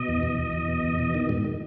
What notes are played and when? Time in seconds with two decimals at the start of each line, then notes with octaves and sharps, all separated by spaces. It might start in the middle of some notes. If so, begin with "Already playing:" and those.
Already playing: B2 D#5
0.08 E2
0.23 E2
0.39 E2
0.53 E2
0.68 B2
0.84 E2
0.99 B2
1.14 D#3
1.29 G#2
1.45 D#3